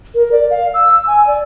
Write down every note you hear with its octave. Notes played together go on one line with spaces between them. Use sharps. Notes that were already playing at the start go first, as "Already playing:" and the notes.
A#4
D5
F5
E6
G#5
D5